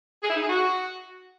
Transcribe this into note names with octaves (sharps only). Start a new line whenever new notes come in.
G#4
E4
D#4
G#4
F#4